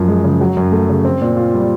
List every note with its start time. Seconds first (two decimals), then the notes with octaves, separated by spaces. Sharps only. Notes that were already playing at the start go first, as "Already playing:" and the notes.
Already playing: F#2 F3
0.08 G#3
0.24 C#3
0.41 F#3
0.57 F#2
0.72 A3
0.89 C#3
1.05 C4
1.21 A#2
1.37 F4
1.54 G3